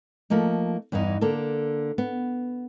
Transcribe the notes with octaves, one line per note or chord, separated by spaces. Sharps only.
F3 A3 A#3 D#4
E2 G2 E3 B3 D#4
D3 A#3 A4
B3